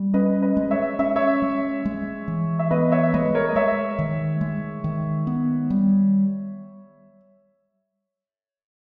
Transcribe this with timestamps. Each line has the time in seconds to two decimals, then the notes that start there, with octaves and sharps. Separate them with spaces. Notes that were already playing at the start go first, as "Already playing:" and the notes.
Already playing: G3
0.14 C#4 B4 D#5
0.42 B4 D#5
0.57 G#3
0.71 C#5 E5
0.99 C#4 E5
1.16 C#5 E5
1.42 G#3
1.85 G#3
2.28 E3
2.59 E5
2.71 B3 B4 D#5
2.92 C#5 E5
3.14 G#3 B4 D#5
3.35 A#4 C#5
3.49 D#5
3.56 G#3 C#5 E5
3.99 D#3
4.41 G#3
4.84 D#3
5.27 B3
5.70 G3